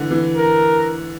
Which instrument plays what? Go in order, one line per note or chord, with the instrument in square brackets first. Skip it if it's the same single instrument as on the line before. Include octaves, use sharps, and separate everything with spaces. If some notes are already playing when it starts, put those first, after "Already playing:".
Already playing: [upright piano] D3 E3
E3
[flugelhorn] A#4